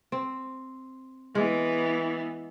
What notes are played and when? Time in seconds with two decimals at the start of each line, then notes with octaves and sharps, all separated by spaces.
0.12 C4
1.35 E3 G#3 B3